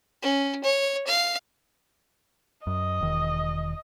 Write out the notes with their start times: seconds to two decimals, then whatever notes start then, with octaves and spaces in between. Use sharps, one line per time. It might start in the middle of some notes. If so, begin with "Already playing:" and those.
0.23 C#4
0.64 C#5
1.07 F5
2.67 F#2 D#5
3.01 E1 D#3